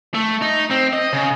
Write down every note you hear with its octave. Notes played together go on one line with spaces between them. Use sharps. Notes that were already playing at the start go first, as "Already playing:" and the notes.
A3
D#4
C4
D#5
C#3